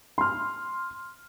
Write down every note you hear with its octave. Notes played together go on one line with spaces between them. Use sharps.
C6 F6